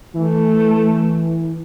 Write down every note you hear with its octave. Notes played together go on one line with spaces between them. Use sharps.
E3 A3